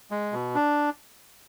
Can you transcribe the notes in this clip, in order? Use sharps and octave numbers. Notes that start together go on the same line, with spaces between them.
G#3
B2
D4